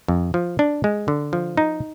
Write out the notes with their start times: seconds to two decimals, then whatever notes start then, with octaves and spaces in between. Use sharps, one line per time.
0.08 F2
0.34 F3
0.59 D4
0.84 G#3
1.08 D3
1.33 F3
1.57 D#4